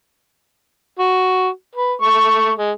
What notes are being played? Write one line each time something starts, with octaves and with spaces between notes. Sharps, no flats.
F#4
B4
A3 C#6
G#3